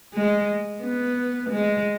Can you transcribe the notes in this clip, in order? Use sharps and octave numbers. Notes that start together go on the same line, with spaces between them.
G#3
B3
G#3